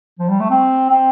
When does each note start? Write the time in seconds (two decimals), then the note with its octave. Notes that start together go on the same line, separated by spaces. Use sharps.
0.19 F3
0.29 G3
0.40 A3
0.50 C4
0.90 C4